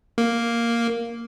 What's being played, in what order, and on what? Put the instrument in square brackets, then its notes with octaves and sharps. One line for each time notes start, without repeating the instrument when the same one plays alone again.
[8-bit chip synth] A#3